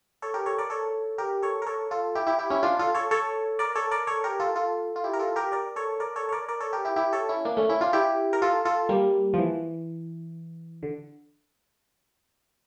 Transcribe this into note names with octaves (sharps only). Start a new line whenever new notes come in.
A4 C#5
G4 A#4
A4 C#5
A#4 D5
A4 C#5
G4 A#4
A4 C#5
A#4
A4 C#5
F4 A4
E4 G4
E4 G4
E4 G4
C#4 E4
D4 F4
F4 A4
A4 C#5
A4 C#5
A#4 D5
A4 C#5
A#4 D5
A4 C#5
G4 A#4
F4 A4
F4 A4
F4
E4 G4
A#4
F4 A4
G4 A#4
A#4 D5
A4 C#5
A#4 D5
A4 C#5
C#5
A#4 D5
A#4 D5
A4 C#5
G4 A#4
E4 G4
E4 G4
A4 C#5
C#4 E4
A#3 D4
A3 C#4
C#4 E4
D4 F4
E4 G4
A#4
F4 A4
F4 A4
G3 A#3
F3
E3
D3